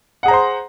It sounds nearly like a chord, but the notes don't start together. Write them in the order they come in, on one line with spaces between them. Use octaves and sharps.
F#5 G#4 A#5 C5 C6